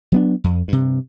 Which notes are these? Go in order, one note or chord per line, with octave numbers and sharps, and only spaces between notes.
F#3 B3 D4
F2
G2 C3